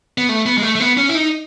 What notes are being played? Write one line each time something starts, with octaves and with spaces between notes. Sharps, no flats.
B3
A3
B3
G#3
A3
A3
B3
C#4
E4
D#4